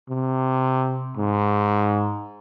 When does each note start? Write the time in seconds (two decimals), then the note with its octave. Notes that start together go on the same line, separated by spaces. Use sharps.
0.09 C3
1.17 G#2